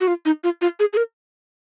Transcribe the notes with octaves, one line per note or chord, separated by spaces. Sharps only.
F#4
F4
D#4
F4
F4
G#4
G#4
A#4